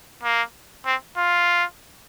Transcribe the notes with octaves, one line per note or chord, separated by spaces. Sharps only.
A#3
C4
F4